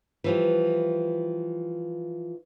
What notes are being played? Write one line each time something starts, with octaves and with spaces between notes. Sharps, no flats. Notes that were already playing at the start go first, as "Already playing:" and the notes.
E3 F3 G3